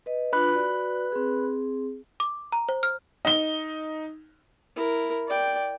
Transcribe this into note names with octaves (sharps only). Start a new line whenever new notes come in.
B4 D#5
D4 F4 B4 B5 F#6
F#4 D5
C4 G#4
D6
A#5
C5
F6
D#4 G7
E4 A#4
D5 G5